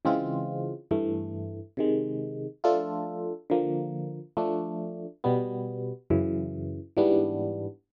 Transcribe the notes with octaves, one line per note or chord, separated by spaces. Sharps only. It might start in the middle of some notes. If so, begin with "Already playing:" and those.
C#3 E3 G#3 C4 F4
G2 E3 A3
C3 D#3 G#3
F3 A3 D4 F4 A4
D3 F3 A#3
F3 A3 D4
B2 G3 B3
F#2 C#3 E3
G#2 E3 G3 B3 D4